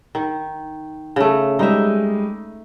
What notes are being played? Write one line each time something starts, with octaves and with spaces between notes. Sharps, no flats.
D#3
C#3 A3
G3 G#3 D#4 D#5 E5